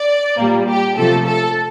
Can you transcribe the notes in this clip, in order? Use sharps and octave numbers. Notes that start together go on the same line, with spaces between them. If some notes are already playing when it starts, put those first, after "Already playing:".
Already playing: D5
A#2 G3 A#3
G4
C3 F3 A3 A4
A4